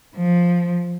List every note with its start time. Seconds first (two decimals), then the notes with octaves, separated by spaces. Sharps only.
0.16 F3